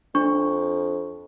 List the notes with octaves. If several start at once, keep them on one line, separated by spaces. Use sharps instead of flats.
F2 D4 C#6